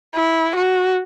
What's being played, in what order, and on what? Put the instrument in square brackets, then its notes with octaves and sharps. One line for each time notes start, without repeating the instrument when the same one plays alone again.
[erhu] E4
F#4